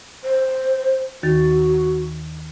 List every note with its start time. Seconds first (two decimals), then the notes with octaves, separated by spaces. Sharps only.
0.24 C5
1.23 D#2 D#3 F#4 A6